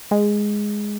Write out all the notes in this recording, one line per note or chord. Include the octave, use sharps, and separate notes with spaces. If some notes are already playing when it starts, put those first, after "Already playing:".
G#3